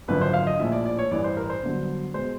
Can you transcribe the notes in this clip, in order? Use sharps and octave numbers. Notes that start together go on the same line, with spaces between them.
G#1 F#2 D3 F3 B4
C5
F5
D#5
A#1 A2 F3 E5
D5
D5
C#5
A1 G2 E3 D5
C5
A#4
C5
G1 G2 D3 F#3
B2 G#3 C5